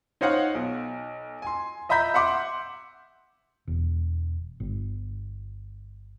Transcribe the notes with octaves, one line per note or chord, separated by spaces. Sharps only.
D#4 C5 C#5 F5 F#5
B1
G#5 C6
D#5 E5 A#5 B5 G6 B6
E5 F#5 C6 D6
E1
G1